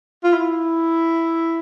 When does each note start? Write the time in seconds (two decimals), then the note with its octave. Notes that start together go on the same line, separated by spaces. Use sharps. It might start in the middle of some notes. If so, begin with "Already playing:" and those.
0.24 F4
0.33 E4